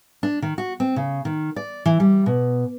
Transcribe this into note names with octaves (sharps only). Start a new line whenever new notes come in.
D4
D#3
F#4
C4
C#3
D#3
D5
E3
G3
B2